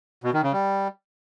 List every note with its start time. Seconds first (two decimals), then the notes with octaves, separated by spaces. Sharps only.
0.24 B2
0.33 D#3
0.43 C#3
0.53 G3